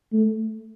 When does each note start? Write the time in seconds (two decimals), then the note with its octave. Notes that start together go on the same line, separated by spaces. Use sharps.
0.13 A3